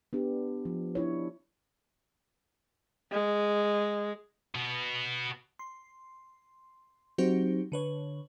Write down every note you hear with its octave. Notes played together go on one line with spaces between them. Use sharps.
B3 D4 G4
F3
D4 E4 C#5
G#3
B2 B3
C6
F#3 C4 D#4 F#4 G4 C5
D3 B4 C#5